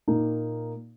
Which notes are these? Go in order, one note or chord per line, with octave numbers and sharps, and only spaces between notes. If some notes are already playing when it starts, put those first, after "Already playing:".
A#2 A#3 D#4